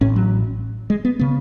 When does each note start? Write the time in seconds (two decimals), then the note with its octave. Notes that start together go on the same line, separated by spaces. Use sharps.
0.01 A1 A2 C#4
0.16 F#3
0.90 G#3
1.05 B3
1.19 C#3 B3